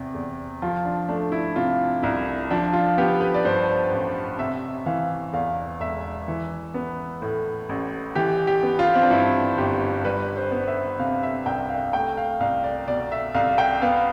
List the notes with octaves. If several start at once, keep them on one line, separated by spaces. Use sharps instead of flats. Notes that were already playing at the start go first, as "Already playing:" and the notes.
Already playing: E2 C3
E2
F3 F4
D4
A3 D4
E4
C3 F4
C2 E4
F3 D4
F4
B3 G4
B4
D5
G2 C5
A1
C3 E5
E3 F5
E2 F5
E1 E5
E3
B3
A2
A1
E3 G4
G4
B3
F4
C4
D4
G2 E4
G1 G4
G3 B4
C5
B3
E5
C3 F5
E5
C2 G5
F5
A3 G5
F5
C2 F5
D5
B2 D5
E5
C2 F5
G5
B3 F5